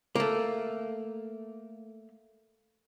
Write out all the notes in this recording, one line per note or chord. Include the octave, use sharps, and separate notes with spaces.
A3 A#3